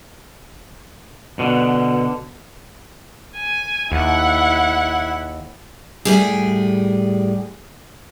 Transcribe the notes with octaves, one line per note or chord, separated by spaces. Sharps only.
B2 D3
G#5
D#2 E4 F#5
A2 G3 G#4